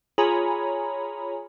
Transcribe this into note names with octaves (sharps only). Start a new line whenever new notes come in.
F4 G#4 C#5 G#5 A#5 B5